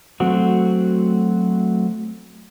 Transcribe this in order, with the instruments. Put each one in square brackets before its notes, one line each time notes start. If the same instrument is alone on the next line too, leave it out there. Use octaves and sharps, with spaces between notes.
[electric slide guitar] F#3 A3 C4 F#4